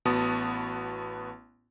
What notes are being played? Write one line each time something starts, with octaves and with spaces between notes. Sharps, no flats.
A1 B3 F#4 A5 D#6